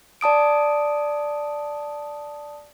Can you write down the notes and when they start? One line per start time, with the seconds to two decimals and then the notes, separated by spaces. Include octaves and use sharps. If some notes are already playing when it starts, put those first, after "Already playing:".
0.21 D5 A5 D#6 D7